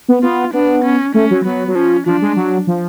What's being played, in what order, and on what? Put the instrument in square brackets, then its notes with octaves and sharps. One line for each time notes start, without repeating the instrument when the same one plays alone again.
[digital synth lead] B3
[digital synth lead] B3 [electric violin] F4
[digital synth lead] B3 [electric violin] D4
[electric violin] C#4
[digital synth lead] A3 [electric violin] C#4
[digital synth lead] F#3
[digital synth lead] F#3 [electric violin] B3
[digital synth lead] F#3
[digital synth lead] F3 [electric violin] C#4
[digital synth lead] F3 [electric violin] D4
[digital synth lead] G#3
F#3
F3